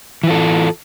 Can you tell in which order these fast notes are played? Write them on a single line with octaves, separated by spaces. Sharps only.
E3 F4 A4